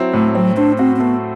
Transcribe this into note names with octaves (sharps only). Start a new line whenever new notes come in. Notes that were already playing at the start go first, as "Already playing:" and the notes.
Already playing: F#3 C4 E4
A2 A3
F#3 C4
D4 C5
C4 F#4
C4
A3 B3